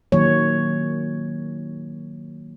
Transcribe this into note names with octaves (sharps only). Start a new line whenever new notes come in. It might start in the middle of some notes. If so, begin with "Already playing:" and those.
D#3 F#3 A#3 C#5